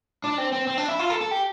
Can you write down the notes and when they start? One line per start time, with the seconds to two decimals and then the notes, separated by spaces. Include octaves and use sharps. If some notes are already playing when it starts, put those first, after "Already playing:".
0.24 D4
0.38 C4
0.52 C4
0.67 C4
0.78 D4
0.89 E4
0.99 F4
1.10 A4
1.21 A4
1.31 G4